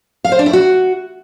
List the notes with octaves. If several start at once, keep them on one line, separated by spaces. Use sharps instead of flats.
F5
C5
D4
E4
F#4